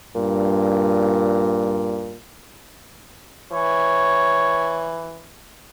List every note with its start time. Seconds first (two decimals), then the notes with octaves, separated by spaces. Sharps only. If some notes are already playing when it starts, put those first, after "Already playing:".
0.15 G2 A#2
3.52 E3 C#5